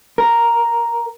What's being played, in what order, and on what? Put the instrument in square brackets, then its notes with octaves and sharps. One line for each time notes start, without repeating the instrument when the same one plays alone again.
[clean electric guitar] A#4